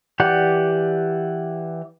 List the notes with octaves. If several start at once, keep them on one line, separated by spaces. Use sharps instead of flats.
E3 G4 D5 F#5